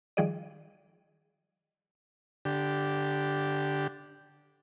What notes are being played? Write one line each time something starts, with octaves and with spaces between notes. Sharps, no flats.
D#3 F3 G3 G#4 D5 D#5
D3 G4